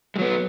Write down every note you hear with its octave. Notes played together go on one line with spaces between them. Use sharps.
F#3 G#3 B3